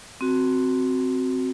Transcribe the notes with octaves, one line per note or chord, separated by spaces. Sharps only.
C4 F#4